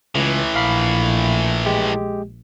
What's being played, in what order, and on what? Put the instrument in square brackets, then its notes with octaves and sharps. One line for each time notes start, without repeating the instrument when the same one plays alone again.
[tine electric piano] C#2 [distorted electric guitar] A2 E3
[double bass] A#1 [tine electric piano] F5 B5 C7
[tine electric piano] G#3 G4